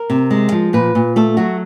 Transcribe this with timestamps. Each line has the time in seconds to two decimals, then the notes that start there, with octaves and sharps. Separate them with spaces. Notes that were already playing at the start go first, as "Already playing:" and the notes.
Already playing: A#4
0.10 C3
0.30 G#3
0.52 F3
0.73 A#2 B4
0.95 A#2
1.16 A3 A4
1.37 F#3 F#4